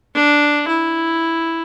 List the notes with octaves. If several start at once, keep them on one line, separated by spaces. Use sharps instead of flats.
D4
E4